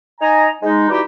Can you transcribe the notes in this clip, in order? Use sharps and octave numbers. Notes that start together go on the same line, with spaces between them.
D#4 D#5 G#5 A#5
G#3 D#4
E3 G3 D#4 E4 F#4 G4